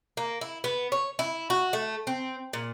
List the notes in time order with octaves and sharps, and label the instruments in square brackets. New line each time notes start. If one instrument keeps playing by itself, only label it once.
[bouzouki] A#3
E4
B3
C#5
E4
F#4
A3
C4
A#2